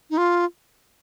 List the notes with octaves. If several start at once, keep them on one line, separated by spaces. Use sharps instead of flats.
D#4
F4